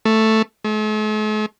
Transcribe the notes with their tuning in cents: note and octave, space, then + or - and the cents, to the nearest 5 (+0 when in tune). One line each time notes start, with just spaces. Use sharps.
A3 +5
A3 -45